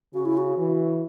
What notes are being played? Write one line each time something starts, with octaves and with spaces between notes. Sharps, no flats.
C#3 F#4
E4
F#4
E3